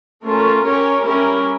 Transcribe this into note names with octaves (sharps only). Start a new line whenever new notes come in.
A3 C#4 F4 A#4
C#4 G4 A#4 C#5
G3 C#4 E4 G4 A#4